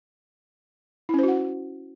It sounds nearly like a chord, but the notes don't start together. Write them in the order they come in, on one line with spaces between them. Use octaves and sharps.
E4 C#4 C5 F#4 F#5